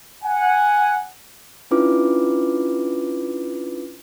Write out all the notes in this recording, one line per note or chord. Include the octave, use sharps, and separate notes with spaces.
F#5 G#5
C#4 D4 E4 F4 B4 D6